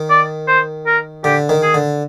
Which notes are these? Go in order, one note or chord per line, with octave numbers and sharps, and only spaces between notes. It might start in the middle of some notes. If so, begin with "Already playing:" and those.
Already playing: D#3
D5
C5
A#4
D3 G4
D#3
G#4
D3